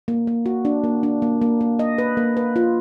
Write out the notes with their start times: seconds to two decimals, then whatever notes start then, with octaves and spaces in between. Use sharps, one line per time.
0.08 A#3
0.27 A#3
0.46 F#4
0.65 D4
0.84 A#3
1.03 D4
1.22 A#3
1.42 A#3
1.61 A#3
1.79 D#5
1.98 B4
2.17 A#3
2.37 B4
2.56 F4